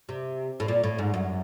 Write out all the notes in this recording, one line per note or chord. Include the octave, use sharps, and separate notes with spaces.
C3
A2
A#2
A2
G#2
F#2